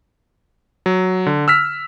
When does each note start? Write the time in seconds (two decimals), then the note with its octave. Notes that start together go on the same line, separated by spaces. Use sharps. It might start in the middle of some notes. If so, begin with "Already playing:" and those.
0.86 F#3
1.26 D3
1.48 E6 F6 B6